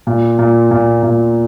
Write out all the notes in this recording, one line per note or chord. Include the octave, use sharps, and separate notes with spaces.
A#2
A#2
A#2
A#2